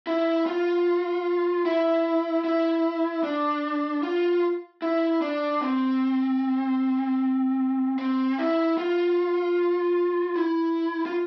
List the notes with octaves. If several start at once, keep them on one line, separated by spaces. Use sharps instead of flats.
E4
F4
E4
E4
D4
F4
E4
D4
C4
C4
E4
F4
E4
F4